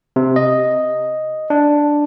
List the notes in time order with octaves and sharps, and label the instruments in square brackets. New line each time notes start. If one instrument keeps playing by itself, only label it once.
[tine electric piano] C3
D#5
D4